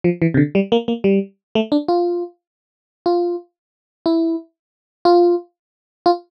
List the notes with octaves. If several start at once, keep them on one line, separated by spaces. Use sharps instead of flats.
F3
E3
C3
D3
G3
A#3
A#3
G3
A3
D4
F4
F4
E4
F4
F4